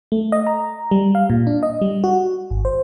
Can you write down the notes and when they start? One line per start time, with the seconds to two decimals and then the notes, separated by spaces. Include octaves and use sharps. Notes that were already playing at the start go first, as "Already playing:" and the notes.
0.12 A3
0.32 D#5
0.47 A#5
0.91 G3
1.15 F5
1.30 A#2
1.47 D4
1.63 D#5
1.82 G3
2.04 F#4
2.50 G#1
2.65 C5